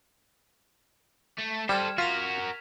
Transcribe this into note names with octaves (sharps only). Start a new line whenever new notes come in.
A3
G3 A4 C5 F6 G#6 E7
F4 F#4 A#4 B6 D#7 F7